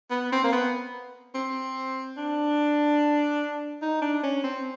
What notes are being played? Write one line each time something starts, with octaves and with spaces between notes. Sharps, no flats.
B3
C4
A#3
B3
C4
D4
D#4
D4
C#4
C4